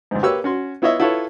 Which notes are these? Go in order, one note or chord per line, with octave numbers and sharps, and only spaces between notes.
C#2 G#2
A#3 G4 B4 C#5 C#6 E6
C#4 F#4 C6
B3 E4 F4 C#5 D#5 E5
E4 F4 A4 B4 C#5